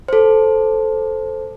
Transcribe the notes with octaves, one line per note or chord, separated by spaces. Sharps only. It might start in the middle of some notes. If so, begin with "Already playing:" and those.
A4 C5